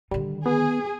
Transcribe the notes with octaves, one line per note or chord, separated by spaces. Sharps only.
D3 D#3 G3
B3 G#4